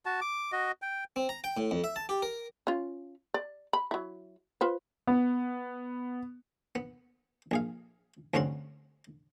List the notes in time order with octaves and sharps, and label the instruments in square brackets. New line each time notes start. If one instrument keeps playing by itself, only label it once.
[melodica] F#4 A5
D6
F#4 D#5
G5
[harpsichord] C4
A#5
G5
A2
F2
E5
A5
G4
A#4
[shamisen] C#4 F4
D5
B5
F#3 E4
F4 B4 C5
[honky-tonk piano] B3
[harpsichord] B3
A#1 G#4 F5
D2 G2 C4 C#4 F#4 C6